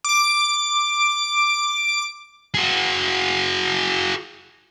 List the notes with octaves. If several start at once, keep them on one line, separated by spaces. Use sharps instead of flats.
D6 D7
F#4 G#4